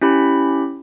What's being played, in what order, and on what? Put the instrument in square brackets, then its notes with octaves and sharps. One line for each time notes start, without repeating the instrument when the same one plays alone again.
[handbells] C#4 E4 G4 B5